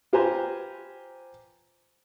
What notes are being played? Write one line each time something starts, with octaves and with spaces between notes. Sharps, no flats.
F4 G4 B4 C5 G#5 A#5